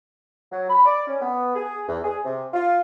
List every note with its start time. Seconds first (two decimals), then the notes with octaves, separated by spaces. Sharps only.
0.52 F#3
0.70 B5
0.86 D5
1.07 C#4
1.22 B3
1.56 G#4
1.88 E2
2.04 G#4
2.25 C3
2.54 F4